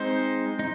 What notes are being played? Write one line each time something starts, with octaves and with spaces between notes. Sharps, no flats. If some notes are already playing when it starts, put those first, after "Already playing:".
Already playing: G#3 C4 D#4 C5
D#4